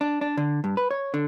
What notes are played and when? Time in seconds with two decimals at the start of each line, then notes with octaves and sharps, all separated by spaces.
0.01 D4
0.21 D4
0.37 D3
0.64 G2
0.77 B4
0.91 C#5
1.14 D3